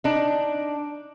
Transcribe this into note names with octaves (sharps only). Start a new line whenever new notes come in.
D4 D#4